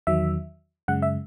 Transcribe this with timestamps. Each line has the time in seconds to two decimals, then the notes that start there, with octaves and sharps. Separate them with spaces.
0.07 E2 D#3 F#3 E5
0.88 F#2 C#3 G#3 F#5
1.02 E5